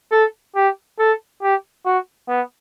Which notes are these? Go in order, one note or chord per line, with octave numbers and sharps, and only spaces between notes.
A4
G4
A4
G4
F#4
B3